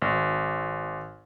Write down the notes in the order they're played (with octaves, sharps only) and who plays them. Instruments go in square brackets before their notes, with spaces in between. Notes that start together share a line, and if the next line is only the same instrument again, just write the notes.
[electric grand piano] G#1